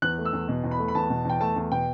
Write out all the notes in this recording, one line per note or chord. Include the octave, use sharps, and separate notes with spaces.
E2 F#6
A3
E6
E2
B2
E2
B5
A3
B5
E2 A5
B2
E2 G5
A3 A5
E2
B2 G5